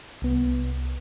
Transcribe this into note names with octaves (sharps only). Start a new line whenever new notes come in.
C2 B3